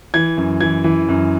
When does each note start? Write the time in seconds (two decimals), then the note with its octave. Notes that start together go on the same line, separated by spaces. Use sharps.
0.14 E3 G#6
0.37 F#2
0.60 E3 G#6
0.84 E3
1.09 F#2